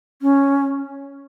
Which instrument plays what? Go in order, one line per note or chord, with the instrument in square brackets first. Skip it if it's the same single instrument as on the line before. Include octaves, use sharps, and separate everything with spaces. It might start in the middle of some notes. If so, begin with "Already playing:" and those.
[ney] C#4